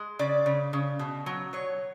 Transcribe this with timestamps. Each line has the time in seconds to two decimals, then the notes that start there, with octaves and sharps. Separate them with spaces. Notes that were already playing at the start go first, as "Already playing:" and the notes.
Already playing: G#3
0.19 C#3 D5
0.46 C#3
0.73 C#3
0.99 B2
1.26 F#3
1.53 F#3 C#5